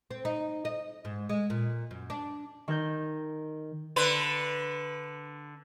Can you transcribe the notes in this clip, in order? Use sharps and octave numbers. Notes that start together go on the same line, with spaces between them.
C4
D#4
D#5
G#2
G#3
A#2
F#2
D4
D#3 A#4 G6
D3 B4